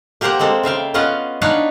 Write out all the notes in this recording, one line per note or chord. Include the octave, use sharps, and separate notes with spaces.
A#3 G4 A#4 C5 F#5 A#5
G#3 A#3 C4 A4
C#3 E5 F5 G5
B3 C#4 F4 D#5 F5 F#5
D4 D#4 B4 C#5 F5 F#5